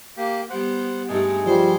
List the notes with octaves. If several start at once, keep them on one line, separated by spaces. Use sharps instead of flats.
A#3 G4
G3 B3 C5 F#5
G2 G#3 A3 D#4 G#4
F3 G3 C5